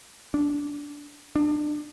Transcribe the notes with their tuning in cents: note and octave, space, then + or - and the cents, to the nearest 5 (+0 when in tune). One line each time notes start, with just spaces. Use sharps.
D4 -15
D4 +30